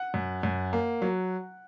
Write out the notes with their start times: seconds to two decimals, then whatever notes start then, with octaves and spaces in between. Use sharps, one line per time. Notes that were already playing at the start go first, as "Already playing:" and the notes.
Already playing: F#5
0.14 F#2
0.43 F#2
0.73 A#3
1.02 F#3